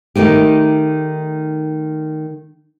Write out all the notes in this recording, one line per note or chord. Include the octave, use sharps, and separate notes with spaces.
D#3 A3 D#4 G4